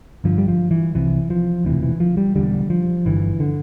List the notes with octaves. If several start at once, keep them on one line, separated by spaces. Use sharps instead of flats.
G1 G2 D3 F3
G3
F3
E3
C2 C3 E3
F3
E1 D2 C3 E3
E3
F3
G3
E1 E2 D3 G3
F3
G1 G2 D3 E3
D3